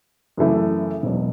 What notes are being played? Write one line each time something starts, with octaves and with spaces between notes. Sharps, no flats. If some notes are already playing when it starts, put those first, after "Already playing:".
F#2 C#3 E3 A3 E4
E1 E2 B2 F#3